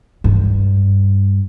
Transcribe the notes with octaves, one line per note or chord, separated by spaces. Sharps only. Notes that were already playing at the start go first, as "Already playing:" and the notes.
G2